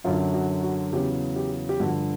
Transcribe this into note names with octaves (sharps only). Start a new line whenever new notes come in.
F#2 D3 F#3 F4
F#4
F#4
E2 C#3 F#3 G4
G4
G4
G2 D3 F3 F#4